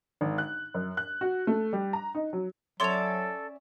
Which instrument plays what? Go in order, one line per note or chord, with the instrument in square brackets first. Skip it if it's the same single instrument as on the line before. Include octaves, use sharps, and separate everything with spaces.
[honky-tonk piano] G#1
F#6
F#2
F#6
F#4
A3
G3
A#5
D#4
F#3
[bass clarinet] F#3 [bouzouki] C#4 D5 E5 [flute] A4 [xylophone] C6 F7